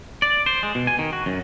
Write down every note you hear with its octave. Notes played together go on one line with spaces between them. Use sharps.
D5
C5
G#3
B2
G#5
D#3
F#4
F#2